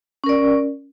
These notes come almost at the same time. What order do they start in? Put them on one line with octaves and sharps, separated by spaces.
C#4 A#4 D5